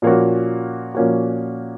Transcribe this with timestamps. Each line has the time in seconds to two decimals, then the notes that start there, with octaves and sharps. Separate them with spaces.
0.02 A#2 F3 A#3 C#4 F#4
0.95 A#2 F3 A#3 C#4 F#4